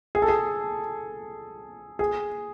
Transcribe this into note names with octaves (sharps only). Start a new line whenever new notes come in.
G#4
A4
G#4
G#4